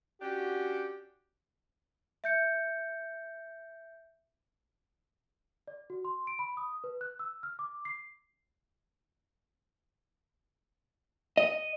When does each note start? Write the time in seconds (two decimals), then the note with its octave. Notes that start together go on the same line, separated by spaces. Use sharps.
0.21 C#4 D4 F#4 G4
2.24 E5 G6 C#7
5.68 D5
5.90 F#4
6.05 C6
6.27 D7
6.39 B5
6.57 D#6
6.84 B4
7.01 F#6
7.19 E6
7.43 F6
7.59 D6
7.85 C7
11.37 D#5